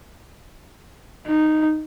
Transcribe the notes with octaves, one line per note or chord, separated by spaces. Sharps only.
D#4